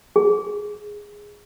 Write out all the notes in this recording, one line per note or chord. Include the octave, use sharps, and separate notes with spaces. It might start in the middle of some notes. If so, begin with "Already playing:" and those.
G#4